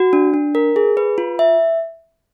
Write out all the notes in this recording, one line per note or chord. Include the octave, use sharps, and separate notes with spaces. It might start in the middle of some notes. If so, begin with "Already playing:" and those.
Already playing: F#4
D4
D4
A#4
G#4
B4
F4
E5